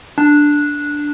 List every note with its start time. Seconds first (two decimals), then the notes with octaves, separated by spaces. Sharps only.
0.18 D4